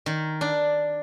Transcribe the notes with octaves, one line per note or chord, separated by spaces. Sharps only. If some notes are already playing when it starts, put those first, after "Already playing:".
D#3
D4